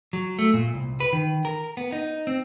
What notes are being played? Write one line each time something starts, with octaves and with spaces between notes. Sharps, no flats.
F#3
A3
A#2
C2
B4
D#3
A#4
B3
D#4
C4